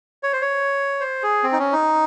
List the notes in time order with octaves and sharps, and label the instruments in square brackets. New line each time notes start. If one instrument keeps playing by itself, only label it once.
[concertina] C#5
C5
C#5
C5
G#4
C4
D#4
C#4
D#4